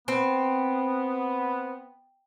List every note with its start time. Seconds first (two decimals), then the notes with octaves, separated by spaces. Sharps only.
0.08 B3 C4